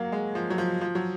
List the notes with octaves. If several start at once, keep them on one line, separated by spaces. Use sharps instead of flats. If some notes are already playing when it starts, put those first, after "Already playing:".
Already playing: F#3 A#3
G#3
F3
F#3
F3
F3
F#3